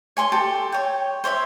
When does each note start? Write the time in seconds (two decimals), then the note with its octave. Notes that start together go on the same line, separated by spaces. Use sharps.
0.17 C#5 G#5 C6 C#6
0.32 G4 A4
0.72 C#5 G5
1.24 C5 C#5 D#5 E5